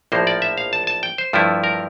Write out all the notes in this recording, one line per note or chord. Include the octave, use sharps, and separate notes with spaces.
A#1 A2 F3 A#3 C5
D5
E5
F5
A5
A5
G5
C5
G2 F3 A3 E4
A#4